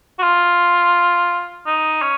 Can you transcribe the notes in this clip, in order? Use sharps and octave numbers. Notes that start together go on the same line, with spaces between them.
F#4
F4
D#4
C#4